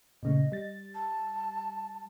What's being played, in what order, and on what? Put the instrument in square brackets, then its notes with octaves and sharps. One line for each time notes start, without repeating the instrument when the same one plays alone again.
[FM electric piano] A#2 C#3 A3 [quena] D#5
[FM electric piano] G3 A6
[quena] A5